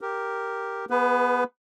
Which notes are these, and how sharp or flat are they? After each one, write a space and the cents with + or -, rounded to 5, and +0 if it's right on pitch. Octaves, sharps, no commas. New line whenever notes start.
G4 +0 A#4 +0
B3 -15 G#4 -5 B4 +20